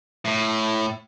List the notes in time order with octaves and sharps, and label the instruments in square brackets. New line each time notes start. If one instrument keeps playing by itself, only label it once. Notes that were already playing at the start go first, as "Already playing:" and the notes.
[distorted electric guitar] A2